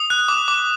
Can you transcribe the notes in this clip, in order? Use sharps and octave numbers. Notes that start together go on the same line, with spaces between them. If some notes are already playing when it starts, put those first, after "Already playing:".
Already playing: D#6
F#6
D6
D6